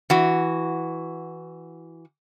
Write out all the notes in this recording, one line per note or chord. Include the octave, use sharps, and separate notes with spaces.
E3 F#4